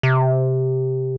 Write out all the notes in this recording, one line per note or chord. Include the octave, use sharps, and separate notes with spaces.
C3